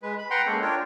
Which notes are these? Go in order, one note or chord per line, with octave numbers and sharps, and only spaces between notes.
G#3 B4
B5
B4 F#5 G5 A#5 C6
G#3 A#3 C#4 A4
D4 F4 A#4 C#5 G5